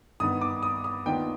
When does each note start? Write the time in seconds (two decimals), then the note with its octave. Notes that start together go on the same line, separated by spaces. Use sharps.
0.20 G2 D#3 B3 D#6
0.41 D6
0.63 D#6
0.84 D#6
1.06 D#2 D#3 B3 D4 F4 G5